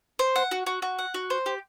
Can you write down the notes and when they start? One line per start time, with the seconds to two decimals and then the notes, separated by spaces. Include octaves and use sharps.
0.19 C5
0.36 F#5
0.51 F#4
0.66 F#4
0.82 F#4
0.99 F#5
1.14 F#4
1.30 C5
1.46 G4